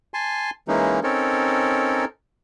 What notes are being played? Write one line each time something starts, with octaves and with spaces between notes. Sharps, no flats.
G#5 A5 C6
E3 G#3 A#3 C#4 D#4
C4 C#4 D#4 A4 A#4 C#5